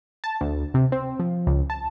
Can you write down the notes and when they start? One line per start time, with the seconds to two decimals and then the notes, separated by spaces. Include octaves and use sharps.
0.24 A5
0.41 D2
0.74 C3
0.92 C4
1.20 F3
1.47 C#2
1.70 A5